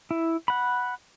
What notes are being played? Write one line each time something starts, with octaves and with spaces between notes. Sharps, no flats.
E4
F#5 B5